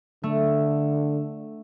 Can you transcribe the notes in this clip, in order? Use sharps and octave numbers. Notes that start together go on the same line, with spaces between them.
D3 A3